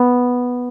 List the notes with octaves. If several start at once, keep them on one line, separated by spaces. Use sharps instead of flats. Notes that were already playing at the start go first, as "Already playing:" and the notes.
Already playing: B3